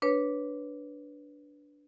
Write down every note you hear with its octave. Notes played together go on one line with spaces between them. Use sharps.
D4 B4 C#5